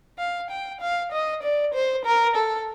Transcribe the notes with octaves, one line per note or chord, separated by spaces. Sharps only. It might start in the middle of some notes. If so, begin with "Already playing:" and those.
F5
G5
F5
D#5
D5
C5
A#4
A4